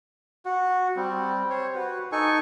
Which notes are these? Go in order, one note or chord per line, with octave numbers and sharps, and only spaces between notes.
F#4
G3 C4
C5 C#5
F#4 B4
D#4 A4 G#5 C#6